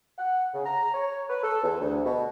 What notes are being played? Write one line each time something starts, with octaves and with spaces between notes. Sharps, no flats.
F#5
C#3
A#5
C#5
B4
A4
E2
D2
B2